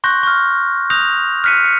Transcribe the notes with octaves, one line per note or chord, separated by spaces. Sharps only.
C6 C#6 F#6 G6 A#6
C#6 F6
D#6 F#6 G6 A#6 F7
F6 F#6 B6 C#7 D#7
C#7